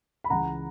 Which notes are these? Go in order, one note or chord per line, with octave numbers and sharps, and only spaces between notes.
B5
C#2 C#3 E3 F#5 A#5